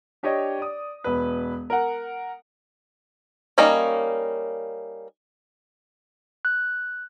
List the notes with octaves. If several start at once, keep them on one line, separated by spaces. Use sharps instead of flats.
D4 G4 C#5 D#5
D5 D#6
E1 B4
A#4 F#5
G3 A#3 C#4 D#4
F#6